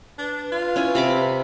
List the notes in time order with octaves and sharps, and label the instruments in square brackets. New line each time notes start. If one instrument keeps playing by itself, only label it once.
[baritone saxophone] D4 [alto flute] B4
[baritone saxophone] F4
[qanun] C#4 E4 G#5
C3 B5 D6